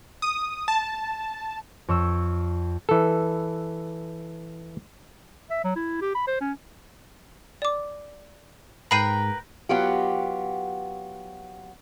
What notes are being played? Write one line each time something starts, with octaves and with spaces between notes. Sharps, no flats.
D#6
A5
F2 C#5 C#6 E6
E3 A4
E5
F#3
E4
G4
B5
C5
C#4
D5 D6
G#2 A#4 B4 G5 B5 C7 D#7
F#3 B3 F4 G4